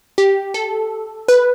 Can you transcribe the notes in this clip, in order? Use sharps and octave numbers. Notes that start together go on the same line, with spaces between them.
G4
A4
B4